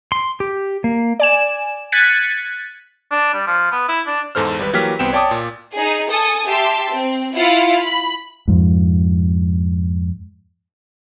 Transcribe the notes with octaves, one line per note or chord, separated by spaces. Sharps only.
C6
G4
A#3
D5 G#5 E7
F#6 G#6 A6 B6 C#7 D#7
D4
G3
F3
B3
E4
D4
E2 G#2 A4 C5 F6
G#1 G3 B4
E3 F#3 A#3 G4 F6 B6
C2 B3 C4 G5 E7
C#5 D5 G5 A5 D6 D#6
A#2
D#4 G#4
A4 G#5 D#6
G4 E5 A5 C6 E6
C4
E4 F4 F5 F#5
B5
F2 G#2